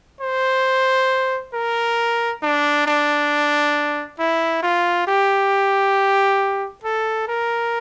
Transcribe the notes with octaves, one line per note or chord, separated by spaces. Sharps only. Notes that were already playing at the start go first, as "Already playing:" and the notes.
C5
A#4
D4
D4
E4
F4
G4
A4
A#4